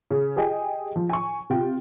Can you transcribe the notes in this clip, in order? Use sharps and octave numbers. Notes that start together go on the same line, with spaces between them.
C#3
G4 G#4 D#5 G5 G#5
F3
G#5 C#6
C3 F4 G5